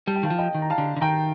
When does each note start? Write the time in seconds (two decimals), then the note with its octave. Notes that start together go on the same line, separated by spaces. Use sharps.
0.07 G3 A5
0.16 G5
0.23 D#3 F5 A5
0.30 F3
0.38 D#5 G5
0.54 D#3
0.62 A#5
0.70 F5 A5
0.78 D3
0.96 D3
1.01 D#3 G5 A#5